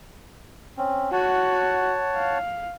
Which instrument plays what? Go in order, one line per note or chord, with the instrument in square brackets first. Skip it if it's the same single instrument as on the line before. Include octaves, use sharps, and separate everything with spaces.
[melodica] C4 C#4
[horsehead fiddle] F#4 [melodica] C#5 F#5 A5
[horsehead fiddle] F5